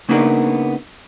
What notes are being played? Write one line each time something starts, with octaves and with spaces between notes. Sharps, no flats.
C#3 A#3 B3 D4 D#4 A#4